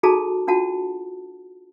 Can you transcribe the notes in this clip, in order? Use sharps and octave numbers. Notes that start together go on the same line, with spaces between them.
D#4 F#4 G#4 A4 A5 A#5
D4 F4 F#4 F#5 A5